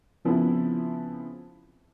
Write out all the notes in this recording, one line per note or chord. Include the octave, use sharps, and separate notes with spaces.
C#3 F3 B3 C4 E4